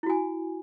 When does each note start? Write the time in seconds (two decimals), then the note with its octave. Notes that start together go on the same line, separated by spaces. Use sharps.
0.03 E4
0.06 F#4
0.10 G#5